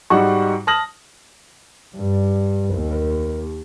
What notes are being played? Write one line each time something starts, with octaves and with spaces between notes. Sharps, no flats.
G#2 G3 D#4 F#4 F#5 C#6
A5 D#6 F6 A#6 F#7
G2
D#2